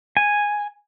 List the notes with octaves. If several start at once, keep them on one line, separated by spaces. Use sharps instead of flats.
G#5